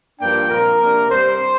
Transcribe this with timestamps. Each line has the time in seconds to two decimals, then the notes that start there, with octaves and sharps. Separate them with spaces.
0.19 G2 F3 A#3 D4 G5
0.49 A#2 F3 C4 A#4
0.80 C3 A#3 D4
1.10 G2 G3 C4 C5